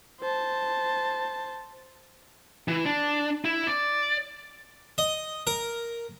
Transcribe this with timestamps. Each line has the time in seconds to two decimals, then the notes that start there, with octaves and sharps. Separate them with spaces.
0.21 C5 A5
2.68 E3
2.86 D4
3.45 E4
3.67 D5
4.98 D#5
5.47 A#4